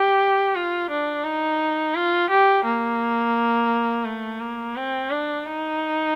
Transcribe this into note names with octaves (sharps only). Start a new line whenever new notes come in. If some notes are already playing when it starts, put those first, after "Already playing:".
Already playing: G4
F4
D4
D#4
F4
G4
A#3
A3
A#3
C4
D4
D#4